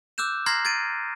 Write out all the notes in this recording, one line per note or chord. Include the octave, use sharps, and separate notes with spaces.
D6 E6 F#6 G6 E7
A#5 C6 F6 G#6 A#6 C7
G#6 A6 D7 D#7